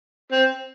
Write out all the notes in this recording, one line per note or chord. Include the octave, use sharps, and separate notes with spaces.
C4